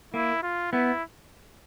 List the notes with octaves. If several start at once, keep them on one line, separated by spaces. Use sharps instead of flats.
A#3 E4
F4
B3 E4